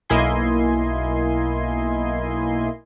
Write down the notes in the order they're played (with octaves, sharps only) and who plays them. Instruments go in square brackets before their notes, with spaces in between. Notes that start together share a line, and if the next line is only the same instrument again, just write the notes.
[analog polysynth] B1 A#3 E4 D#5 G#5 C6